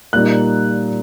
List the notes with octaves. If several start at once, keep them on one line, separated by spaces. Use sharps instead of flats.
A#2 G3 A#3 D#4 F#6